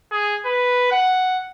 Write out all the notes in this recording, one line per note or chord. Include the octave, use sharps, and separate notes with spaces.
G#4
B4
F#5